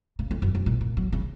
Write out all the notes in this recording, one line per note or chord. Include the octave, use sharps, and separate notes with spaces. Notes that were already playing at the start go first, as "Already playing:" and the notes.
C#3
F2
F#2
F#2
A#2
A#2
F#3
C#3